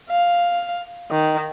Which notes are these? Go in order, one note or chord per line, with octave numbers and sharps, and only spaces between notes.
F5
D#3